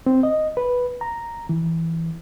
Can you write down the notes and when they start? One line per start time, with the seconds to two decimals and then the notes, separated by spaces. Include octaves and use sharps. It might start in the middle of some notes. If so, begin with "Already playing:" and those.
0.06 C4
0.23 D#5
0.57 B4
1.01 A#5
1.49 E3